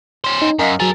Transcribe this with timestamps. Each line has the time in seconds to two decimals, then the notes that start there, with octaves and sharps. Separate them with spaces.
0.24 C#4 C5
0.42 D#4
0.59 F#2 A#4 D#5 F5
0.80 F#3 G#4 A#4 A6